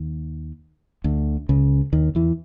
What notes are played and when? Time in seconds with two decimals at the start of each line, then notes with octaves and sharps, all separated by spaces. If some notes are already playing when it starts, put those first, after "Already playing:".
Already playing: D#2 D#3
1.04 D2 D3
1.49 C#2 C#3
1.93 D#2 D#3
2.15 E2 E3